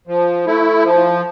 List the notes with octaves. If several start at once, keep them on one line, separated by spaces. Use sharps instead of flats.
F3
A3 E4
F3